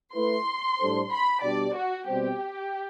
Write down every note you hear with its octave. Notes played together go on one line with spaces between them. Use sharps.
A3 E4 B4 C6
A2 G3 D4 A4 C5
B5
B2 G3 D4 G4 D5
F#4
B2 G3 C4 G4